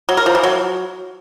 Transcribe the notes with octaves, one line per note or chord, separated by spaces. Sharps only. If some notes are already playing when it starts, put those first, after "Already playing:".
F#3
A#4
F3
E3
F#3